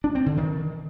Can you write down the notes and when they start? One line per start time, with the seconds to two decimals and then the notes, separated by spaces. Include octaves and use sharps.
0.04 D4
0.15 C4
0.26 D3
0.37 D#3